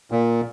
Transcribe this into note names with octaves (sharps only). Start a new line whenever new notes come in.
A#2